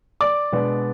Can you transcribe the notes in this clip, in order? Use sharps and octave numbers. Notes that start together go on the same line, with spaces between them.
D5 D6
B2 G#3 B3 D4